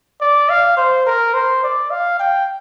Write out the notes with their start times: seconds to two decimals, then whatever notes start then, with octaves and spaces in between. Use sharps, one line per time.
0.21 D5
0.49 F5
0.77 C5
1.06 A#4
1.34 C5
1.63 D5
1.91 F5
2.20 G5